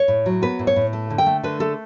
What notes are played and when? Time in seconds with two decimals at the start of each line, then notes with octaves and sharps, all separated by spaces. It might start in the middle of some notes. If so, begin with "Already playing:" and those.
Already playing: C#5
0.08 A2
0.26 F#3
0.42 B3 B4
0.59 A2
0.67 C#5
0.76 A2
0.93 A3
1.10 D3
1.18 G5
1.26 A3
1.44 D3 B4
1.60 A3 A4